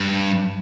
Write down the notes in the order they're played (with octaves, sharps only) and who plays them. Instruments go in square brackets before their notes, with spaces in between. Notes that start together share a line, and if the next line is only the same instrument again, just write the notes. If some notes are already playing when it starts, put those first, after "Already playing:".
Already playing: [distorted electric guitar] G2